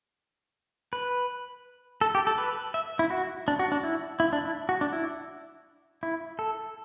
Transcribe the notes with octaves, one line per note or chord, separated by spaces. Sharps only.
B4
A4
G4
A4
B4
E5
E4
F#4
D4
F#4
D4
E4
E4
D4
E4
F#4
D4
E4
E4
A4